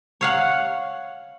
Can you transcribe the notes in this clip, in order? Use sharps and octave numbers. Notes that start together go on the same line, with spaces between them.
C#5 F5 F#5